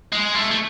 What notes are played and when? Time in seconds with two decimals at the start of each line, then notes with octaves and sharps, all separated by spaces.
0.13 G#3
0.35 A3
0.51 A3